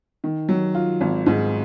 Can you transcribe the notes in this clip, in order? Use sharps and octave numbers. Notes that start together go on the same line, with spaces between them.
D#3
F#3
F4
G#1
G#2